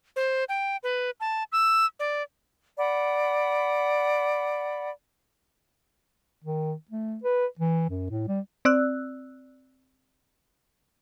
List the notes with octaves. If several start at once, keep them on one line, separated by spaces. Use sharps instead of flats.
C5
G5
B4
A5
E6
D5
D5 F#5 B5
D#3
A3
B4
E3
F#2
A2
G3
C4 D5 E6 F#6